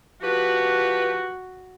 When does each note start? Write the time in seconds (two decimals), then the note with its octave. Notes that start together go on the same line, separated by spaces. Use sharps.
0.22 F3 F#4 G4 B4